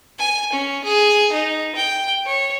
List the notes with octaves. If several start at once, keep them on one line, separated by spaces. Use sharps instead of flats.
G#5
C#4
G#4
D#4
G5
C#5